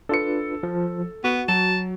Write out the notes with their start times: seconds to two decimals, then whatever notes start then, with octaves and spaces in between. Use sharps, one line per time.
0.09 D4 F4 A4 B4 C#7
0.63 F3
1.24 B3 F#4
1.48 F#3 A5